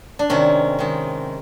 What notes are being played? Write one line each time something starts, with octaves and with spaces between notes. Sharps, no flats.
D4
C3 D#3 G#3 C#4
C3 D#3 G#3